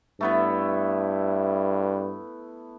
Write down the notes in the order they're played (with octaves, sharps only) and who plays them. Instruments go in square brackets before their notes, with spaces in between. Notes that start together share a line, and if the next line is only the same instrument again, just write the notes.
[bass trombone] G2 [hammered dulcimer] A3 B3 E4